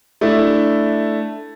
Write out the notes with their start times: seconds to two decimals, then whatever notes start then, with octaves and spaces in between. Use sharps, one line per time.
0.21 A3 D4 E4